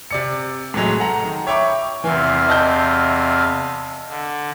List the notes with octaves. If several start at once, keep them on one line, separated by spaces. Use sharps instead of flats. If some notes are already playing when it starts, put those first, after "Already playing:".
C3 D5 C#7
A2 E3 F#3 G#3
A4 F#5 A#5
D#3
C#5 E5 G5 B5 C#6 D6
E2 C3 E3 F5
D#5 A5 G6
D3